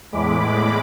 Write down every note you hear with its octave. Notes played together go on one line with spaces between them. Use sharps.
E2 A2 G#3 B5 D6